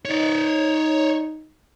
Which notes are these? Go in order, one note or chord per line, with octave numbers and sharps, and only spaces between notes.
D#4 C#5 D5